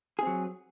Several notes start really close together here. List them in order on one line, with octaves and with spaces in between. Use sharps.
G#4 C4 F#3